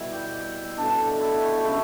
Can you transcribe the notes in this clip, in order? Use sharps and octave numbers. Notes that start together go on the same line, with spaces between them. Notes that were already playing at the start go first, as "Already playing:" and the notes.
Already playing: B2 G3 E4
G4
B2 A3 D4
E4
F#4
G4
F#4
C#3 F#3 A3 E4